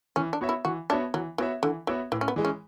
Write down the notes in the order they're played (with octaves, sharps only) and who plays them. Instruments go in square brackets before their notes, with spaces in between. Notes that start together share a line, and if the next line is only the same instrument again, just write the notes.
[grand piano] E3 [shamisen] C#4
[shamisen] D4
[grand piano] B3 F#4 C#5 E5
[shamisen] E4
[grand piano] E3 [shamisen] F#4
[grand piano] B3 F#4 C#5 E5 [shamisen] D4
[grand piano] E3 [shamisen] F#3
[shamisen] E3 [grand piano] B3 F#4 C#5 E5
[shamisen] D3 [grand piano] E3
[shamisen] E3 [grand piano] B3 F#4 C#5 E5
[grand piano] A2 [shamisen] E3
[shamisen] C#4
B3
[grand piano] E3 G#3
[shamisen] C#4